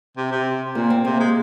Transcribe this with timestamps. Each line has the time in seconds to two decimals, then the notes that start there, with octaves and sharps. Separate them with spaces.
0.17 C3
0.32 C3
0.75 A#2 A#3
0.90 C4
1.05 C3 A#3
1.20 G#3